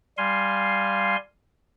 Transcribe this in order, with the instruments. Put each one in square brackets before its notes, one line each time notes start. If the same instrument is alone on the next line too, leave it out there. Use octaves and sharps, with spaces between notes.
[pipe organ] G3 F5 G#5 C6